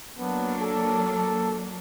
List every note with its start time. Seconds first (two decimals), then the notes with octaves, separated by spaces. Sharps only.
0.18 F#3 A#3 B3 D4
0.62 A4